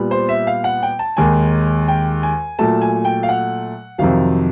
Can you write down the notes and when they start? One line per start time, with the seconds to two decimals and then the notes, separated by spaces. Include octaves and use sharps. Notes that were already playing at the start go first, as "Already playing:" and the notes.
Already playing: A#2 G3 B3
0.11 C5
0.29 E5
0.47 F5
0.64 F#5
0.83 G5
0.99 A5
1.17 D#2 D#3 G#3 G#5
1.88 G5
2.23 G#5
2.59 A#2 F#3 A3 A5
2.81 G#5
3.05 G5
3.23 F5
3.29 F#5
3.98 F2 C3 D#3 F#3 F5